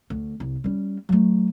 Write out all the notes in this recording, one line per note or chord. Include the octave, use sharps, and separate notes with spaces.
D2
C2
G3 C#4
F#3 A3